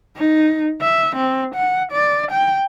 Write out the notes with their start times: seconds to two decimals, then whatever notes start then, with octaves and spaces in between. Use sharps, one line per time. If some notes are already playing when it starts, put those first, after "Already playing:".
0.17 D#4
0.81 E5
1.16 C4
1.55 F#5
1.93 D5
2.32 G5